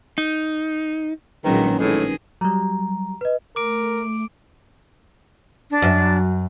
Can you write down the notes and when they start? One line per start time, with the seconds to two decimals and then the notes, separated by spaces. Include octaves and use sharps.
0.18 D#4
1.44 A#1 A#2 D#3 F#3 G#3 C#4 B4
1.79 A2 D#3 G#4
2.41 F#3 G3 A#5
3.21 B4 D#5
3.56 A3 A#4 D6 D7
5.71 D4
5.82 F#2